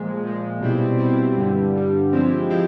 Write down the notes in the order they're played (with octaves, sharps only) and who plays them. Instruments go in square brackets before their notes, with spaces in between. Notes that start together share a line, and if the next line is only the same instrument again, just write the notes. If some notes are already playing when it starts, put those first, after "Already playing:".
Already playing: [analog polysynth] A#2 F3 G#3
A#2 F3 G#3
B2 G3 C4 E4
B2 G3 C4 E4
G2 D3 G3
G2 D3 G3
F3 G#3 C4 E4 G4
F3 G#3 C4 E4 G4